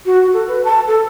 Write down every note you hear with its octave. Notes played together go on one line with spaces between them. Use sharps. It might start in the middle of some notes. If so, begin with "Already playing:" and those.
F#4
A4
B4
A5
A4